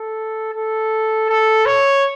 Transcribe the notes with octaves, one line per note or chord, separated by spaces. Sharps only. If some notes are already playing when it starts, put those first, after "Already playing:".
Already playing: A4
A4
A4
C#5